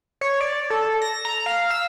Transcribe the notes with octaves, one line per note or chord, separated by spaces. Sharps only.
C#5
D5
A4
A#6
A#5
F5
E6